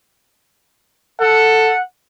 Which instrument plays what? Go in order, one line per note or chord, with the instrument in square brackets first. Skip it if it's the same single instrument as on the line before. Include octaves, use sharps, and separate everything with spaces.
[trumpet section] A4 F#5